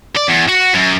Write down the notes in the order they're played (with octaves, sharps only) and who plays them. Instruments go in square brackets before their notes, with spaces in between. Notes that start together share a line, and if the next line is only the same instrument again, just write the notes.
[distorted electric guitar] D5
E2
F#4
F#2